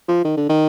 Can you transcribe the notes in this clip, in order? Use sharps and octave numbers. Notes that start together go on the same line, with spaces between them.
F3
D#3
D3
D#3